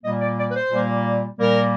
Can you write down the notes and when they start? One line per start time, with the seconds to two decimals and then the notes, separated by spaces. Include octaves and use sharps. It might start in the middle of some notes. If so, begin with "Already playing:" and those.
0.03 A#2 G3 A#3 D#5
0.20 D5
0.38 D5
0.50 B4
0.54 C5
0.72 A#2 G3 A#3
1.39 A#2 G3 A#3 A#4